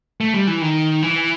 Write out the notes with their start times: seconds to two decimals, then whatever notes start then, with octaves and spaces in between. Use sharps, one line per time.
0.21 A3
0.34 G3
0.47 E3
0.62 D#3
1.02 E3